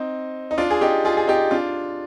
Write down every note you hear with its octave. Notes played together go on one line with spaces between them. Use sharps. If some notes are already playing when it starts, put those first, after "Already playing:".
Already playing: C4 D#4
D#4
D4 F4
G#4
D#4 G4
F4 G#4
G#4
D#4 G4
D4 F4